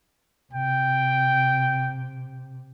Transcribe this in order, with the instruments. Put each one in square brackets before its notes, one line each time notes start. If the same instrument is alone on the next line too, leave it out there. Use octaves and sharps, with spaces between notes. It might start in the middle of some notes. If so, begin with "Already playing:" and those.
[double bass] C3 [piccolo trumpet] G5